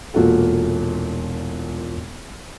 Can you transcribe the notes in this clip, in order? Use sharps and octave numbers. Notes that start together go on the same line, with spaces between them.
E1 A#2 F4 F#4 A4